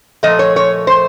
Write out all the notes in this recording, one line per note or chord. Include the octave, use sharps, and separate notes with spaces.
A#2 F3 A3 D#5
C#5
C#5
C5